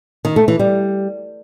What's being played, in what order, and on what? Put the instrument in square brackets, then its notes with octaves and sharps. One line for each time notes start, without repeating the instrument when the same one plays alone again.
[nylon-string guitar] D#3
A3
E3
G3